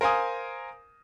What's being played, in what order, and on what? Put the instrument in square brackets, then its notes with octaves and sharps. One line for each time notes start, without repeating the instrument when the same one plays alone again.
[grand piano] A#4 C5 F5 G#5 D#6